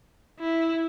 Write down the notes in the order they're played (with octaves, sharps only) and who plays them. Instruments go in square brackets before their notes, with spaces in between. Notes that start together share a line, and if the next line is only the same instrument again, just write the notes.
[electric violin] E4